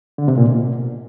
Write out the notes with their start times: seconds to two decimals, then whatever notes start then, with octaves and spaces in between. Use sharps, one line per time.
0.18 D3
0.28 C3
0.38 A#2
0.47 B2